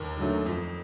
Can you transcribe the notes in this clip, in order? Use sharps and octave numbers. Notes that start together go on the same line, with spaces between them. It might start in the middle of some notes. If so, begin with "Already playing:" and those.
Already playing: D#2 A#4
D3 F#3 A3
F2